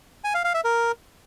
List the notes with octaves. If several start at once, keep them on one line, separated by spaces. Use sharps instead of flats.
G#5
F5
F5
E5
A#4